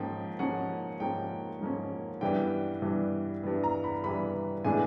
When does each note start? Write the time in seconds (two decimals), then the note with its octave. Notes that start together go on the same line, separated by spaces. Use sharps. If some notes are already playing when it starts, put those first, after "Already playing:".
Already playing: G#2 F3 A#3 C#4 G5
0.39 G#2 F3 A#3 C#4 F#5
1.00 G#2 F3 A#3 C#4 G5
1.61 G#2 F3 A#3 C#4
2.21 G2 E3 G3 B3 G5
2.82 G2 E3 G3 B3
3.43 G2 E3 G3 B3
3.64 A#5
3.84 B5
4.04 G2 E3 G3 B3 B5
4.64 A2 E3 G#3 B3 D4 G#5